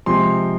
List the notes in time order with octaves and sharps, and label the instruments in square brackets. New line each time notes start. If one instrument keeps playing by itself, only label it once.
[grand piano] C3 F3 G#3 C4 C6